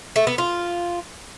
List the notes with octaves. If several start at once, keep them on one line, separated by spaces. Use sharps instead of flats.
A3
B3
F4